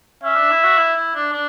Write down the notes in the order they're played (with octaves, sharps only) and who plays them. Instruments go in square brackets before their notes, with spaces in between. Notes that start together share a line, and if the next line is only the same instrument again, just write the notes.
[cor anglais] C#4 [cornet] E5
[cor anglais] D4
E4
F#4
E4
E4
D4
D4